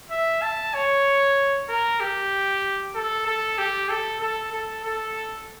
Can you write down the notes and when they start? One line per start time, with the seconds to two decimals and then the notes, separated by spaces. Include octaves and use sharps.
0.11 E5
0.42 A5
0.74 C#5
1.69 A#4
2.00 G4
2.95 A4
3.26 A4
3.58 G4
3.89 A4
4.21 A4
4.52 A4
4.84 A4